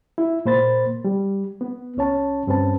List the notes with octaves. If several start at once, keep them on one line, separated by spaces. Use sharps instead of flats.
E4
A#2 A#3 C5 B5 A6
G3
B3
C2 C#4 C#5 A5
G2 C4 C#4 B4 A5